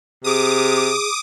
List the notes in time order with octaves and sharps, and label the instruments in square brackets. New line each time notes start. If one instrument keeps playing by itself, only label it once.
[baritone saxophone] C3 [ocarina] G#4 [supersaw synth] D6 D#6